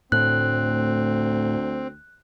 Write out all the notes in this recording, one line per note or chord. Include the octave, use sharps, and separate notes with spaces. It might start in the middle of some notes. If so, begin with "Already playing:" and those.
D2 A2 C4 F#6